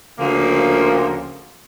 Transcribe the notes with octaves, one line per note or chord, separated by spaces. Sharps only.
D2 C#3 F3 A#3